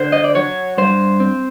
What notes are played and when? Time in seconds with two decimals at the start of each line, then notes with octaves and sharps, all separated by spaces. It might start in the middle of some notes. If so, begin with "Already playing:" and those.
Already playing: D3 C5
0.12 D#5
0.24 D5
0.35 F#3 C#5
0.78 G2 C5
1.20 C4